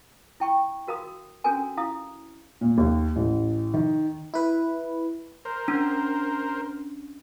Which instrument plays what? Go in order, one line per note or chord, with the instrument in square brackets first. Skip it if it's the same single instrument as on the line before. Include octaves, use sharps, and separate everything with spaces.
[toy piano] E4 G5 C#6
F#4 A#4 F5 B5 D#6
C#4 D4 F#4 A4 A#4 G#5
E4 F5 D#6
[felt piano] A#2
D#2
A1
D#3
[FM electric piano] E4 B4
[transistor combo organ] A#4 C5
[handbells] C#4 D4